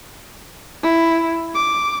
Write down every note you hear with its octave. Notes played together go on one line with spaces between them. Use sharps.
E4
D6